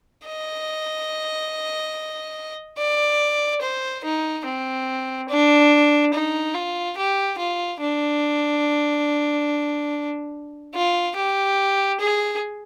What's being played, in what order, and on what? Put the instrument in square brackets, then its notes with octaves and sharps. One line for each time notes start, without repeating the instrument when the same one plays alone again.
[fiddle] D#5
D5
C5
D#4
C4
D4
D#4
F4
G4
F4
D4
F4
G4
G#4